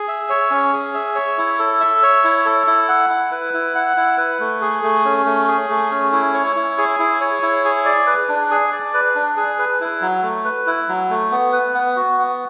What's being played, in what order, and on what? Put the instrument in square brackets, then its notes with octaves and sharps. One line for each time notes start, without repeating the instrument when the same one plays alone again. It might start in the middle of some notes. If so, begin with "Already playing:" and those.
Already playing: [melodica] G#4
E5
C#5
C#4
G#4
E5
C#5
E4
A4
E5
C#5
E4
A4
E4
F#5
E4
B4
E4
F#5
E4
B4
A3
G#4
A3
C#4
A3
G#4
A3
C#4
E4
C#5
E4
G#4
E4
C#5
E4
G#4
D5
B4
D4
G#4
D5
B4
D4
G#4
B4
E4
F#3
A3
B4
E4
F#3
A3
B3
B4
B3
F#4
B3